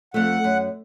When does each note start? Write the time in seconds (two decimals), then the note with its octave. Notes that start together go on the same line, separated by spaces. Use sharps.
0.14 F2 A3 F#5
0.44 F#2